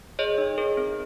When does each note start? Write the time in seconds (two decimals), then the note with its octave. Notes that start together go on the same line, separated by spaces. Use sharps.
0.19 G#4 C#5 D#5
0.38 D#4
0.58 G#4 A#4
0.77 C4